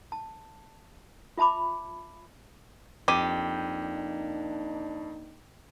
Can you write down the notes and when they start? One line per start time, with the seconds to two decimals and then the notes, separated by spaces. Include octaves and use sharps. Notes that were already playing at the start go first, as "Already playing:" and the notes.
0.12 A5
1.37 F4 E5 A5 B5 D6
3.08 F2 A#3 D4 D#4 G4 D#7